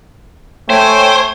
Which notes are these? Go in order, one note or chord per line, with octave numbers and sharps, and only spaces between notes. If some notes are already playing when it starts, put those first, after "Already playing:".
A3 C5 C#5 G5 G#5